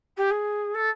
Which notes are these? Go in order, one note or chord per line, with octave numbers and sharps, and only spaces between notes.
G4
G#4
A4